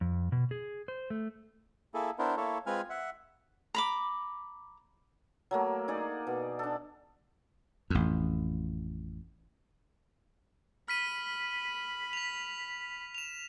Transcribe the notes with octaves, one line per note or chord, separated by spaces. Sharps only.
F2
B2
G#4
C5
A3
A#3 E4 G#4 A4
B3 D4 E4 A#4 C5
A#3 E4 A4 C#5
G#3 C4 F4 B4 G#5 F6
E5 F#5
A#5 B5 D6
F#3 A3 A#3
D#4 G#4 D5
B2
D4 A4
A1 F2
B5 F6 B6 D#7
B6 F7
E7 F7